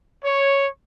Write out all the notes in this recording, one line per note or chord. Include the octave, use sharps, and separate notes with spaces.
C#5